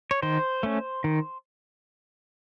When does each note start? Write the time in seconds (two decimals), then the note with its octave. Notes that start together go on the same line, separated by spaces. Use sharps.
0.11 C#5
0.22 D#3 C5
0.63 A3 C#4
1.04 D#3